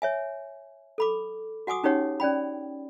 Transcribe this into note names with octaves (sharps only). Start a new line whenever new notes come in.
C#5 E5 G#5
A4 B5 D6
F#4 F#5 G#5 D6 D#6
C#4 D#4 G4 C#5 F#5
C#4 D5 G5 B5